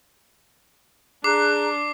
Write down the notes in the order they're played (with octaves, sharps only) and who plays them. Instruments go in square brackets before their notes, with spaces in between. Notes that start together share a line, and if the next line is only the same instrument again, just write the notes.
[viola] D4 [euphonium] G#4 [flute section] A#5 F#6 [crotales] D6 C7